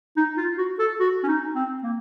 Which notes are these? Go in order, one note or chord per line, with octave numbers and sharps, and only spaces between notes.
D#4
F4
F#4
A4
F#4
C#4
D#4
C4
A#3